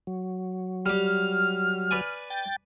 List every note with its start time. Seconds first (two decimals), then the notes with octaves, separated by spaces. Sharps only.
0.07 F#3
0.86 G3 G4 F6
1.91 B4 D5 G#5
2.30 G5 A6